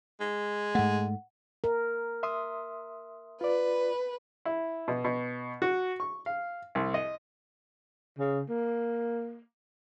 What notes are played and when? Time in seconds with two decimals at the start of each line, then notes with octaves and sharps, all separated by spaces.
0.20 G#3
0.75 G#2 A3 F#5
1.64 A#4
2.23 E5 C6 D#6
3.41 F4 B4 D5
4.45 E4
4.88 B2
5.04 B2
5.62 F#4
6.00 C#6
6.26 F5
6.75 C2
6.94 D#5
8.18 C#3
8.49 A#3